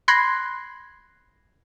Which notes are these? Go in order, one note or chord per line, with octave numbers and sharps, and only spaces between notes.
B5 C6 F#6 G#6 A#6 C7